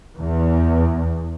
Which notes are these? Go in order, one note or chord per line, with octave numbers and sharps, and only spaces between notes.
E2